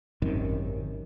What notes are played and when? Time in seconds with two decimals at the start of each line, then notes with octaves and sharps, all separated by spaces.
0.22 G#1 F#2 C3 D#3